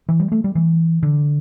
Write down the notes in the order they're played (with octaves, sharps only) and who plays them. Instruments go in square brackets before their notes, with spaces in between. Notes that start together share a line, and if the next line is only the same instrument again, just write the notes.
[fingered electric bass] E3
G3
A3
G3
E3
D3